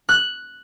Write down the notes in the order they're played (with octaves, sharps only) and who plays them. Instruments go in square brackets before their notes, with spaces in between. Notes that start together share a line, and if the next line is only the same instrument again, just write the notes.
[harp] F#6